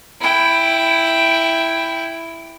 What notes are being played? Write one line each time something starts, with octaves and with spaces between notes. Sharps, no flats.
E4 G5